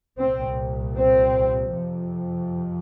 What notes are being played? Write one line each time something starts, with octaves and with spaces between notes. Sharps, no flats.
C2 A#2 C4
C4
F2 C3